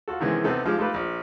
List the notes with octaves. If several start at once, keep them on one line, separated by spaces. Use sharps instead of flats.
F4 F#4 A4
C3 D#3 E3 G#3 B3 C#4
C3 B3 C4 D#4 A4
F3 G#3 D#4 F4 G4
A3 D#4 F4 G4 A4 B4
A#1